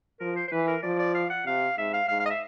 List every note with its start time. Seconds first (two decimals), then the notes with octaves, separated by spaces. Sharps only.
0.20 F3 A#4
0.36 C5
0.47 C5
0.51 E3 B4
0.67 A#4
0.83 F3 D5
0.99 D5
1.14 F5
1.30 F#5
1.46 C3 F5
1.78 G#2 E5
1.93 F5
2.08 G#2 F5
2.20 F5
2.25 D#5
2.30 E5